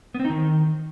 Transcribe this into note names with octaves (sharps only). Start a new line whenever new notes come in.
B3
C4
D#4
D#3